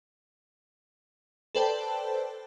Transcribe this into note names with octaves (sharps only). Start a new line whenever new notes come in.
A4 B4 C5 D5 G5 A5